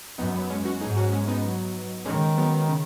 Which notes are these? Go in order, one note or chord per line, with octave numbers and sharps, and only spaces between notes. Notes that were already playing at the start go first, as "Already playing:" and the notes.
F#2 B3 D#4
F#3 B3
G#3 C#4
C#4 F#4
G#2 D#4 G#4
C#4 F#4
G#3 C#4
B3 D#4
F#3
D#3 G#3 C#4
F#3 B3
C#3